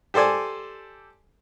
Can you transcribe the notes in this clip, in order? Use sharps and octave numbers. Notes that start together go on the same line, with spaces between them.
G4 A4 C5 D5 G#5